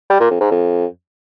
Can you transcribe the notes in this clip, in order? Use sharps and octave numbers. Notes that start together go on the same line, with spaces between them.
G3
A#2
F2
G#2
F2